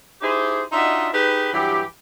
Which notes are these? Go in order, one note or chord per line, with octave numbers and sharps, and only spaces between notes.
D#4 E4 G4 G#4 C5
D4 D#4 F4 F#4 D#5 E5
D#4 G4 G#4 B4
G2 E3 F#3 G4